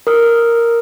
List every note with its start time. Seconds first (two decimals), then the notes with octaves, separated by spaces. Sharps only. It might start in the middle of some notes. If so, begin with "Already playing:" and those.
0.07 A#4 D#6 F6